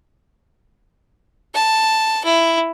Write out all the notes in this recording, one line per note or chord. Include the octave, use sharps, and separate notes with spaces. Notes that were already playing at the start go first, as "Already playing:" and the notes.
A5
E4